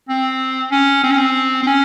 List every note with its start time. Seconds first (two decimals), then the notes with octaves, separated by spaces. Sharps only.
0.09 C4
0.71 C#4
1.04 C4
1.11 C#4
1.17 C4
1.63 C4
1.67 C#4